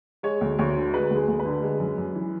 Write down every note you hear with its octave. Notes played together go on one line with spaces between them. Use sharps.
G#3 C#5
D2
D2 C#5
D3
G#3 B4
D2
G#4
D2
B4
D3
G#3
F#2
F#2
E3